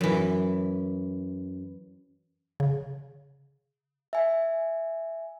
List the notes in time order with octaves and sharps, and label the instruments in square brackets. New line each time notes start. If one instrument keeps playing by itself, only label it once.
[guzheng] F#2 E3
[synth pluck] C#3
[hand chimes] E5 G#5